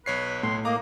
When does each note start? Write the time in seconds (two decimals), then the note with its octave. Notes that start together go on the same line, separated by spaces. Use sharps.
0.06 B1 B4 C#5 C7
0.43 A2 C6
0.65 A#3 D#5 A#5 D6